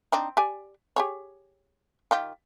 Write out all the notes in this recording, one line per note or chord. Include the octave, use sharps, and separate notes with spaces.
C4 D4 D#4
G4 D5 G#5
G4 G#4 C#5
D#3 F4 G4